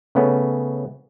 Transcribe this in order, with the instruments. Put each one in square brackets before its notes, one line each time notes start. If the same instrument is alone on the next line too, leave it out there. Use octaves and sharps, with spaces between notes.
[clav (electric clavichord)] C#3 A3 B3 C#4